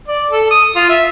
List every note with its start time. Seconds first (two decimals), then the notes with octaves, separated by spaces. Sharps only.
0.08 D5
0.31 A4
0.50 D#6
0.75 F4
0.89 E5